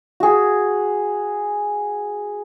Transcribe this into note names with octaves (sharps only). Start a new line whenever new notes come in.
F#4 G#4